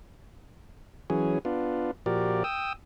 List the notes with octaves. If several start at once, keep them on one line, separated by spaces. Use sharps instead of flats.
E3 F#3 C#4 G#4
B3 D4 F4
A#2 F3 F#4 G4 A#4 D5
G5 D#6 E6